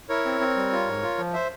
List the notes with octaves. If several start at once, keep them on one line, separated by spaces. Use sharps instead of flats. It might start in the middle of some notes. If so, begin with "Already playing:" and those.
E4 A#4 C#5
C4
C4
G3
F4
G#2
F4
F3
C5 E5